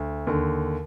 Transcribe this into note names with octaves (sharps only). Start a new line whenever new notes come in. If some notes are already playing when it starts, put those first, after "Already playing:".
Already playing: D2
D#2 D3